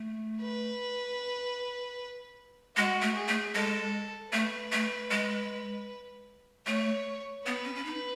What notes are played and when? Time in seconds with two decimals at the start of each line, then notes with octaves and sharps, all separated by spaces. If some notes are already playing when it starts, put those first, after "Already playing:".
Already playing: A3
0.42 B4
2.76 G#3 F#4
3.02 A3
3.15 G#4
3.28 A3
3.55 G#3 A4
4.33 A3 B4
4.72 A3
5.11 G#3
6.67 A3 C#5
7.46 B3 B4
7.65 C#4
7.75 C#4
7.85 D#4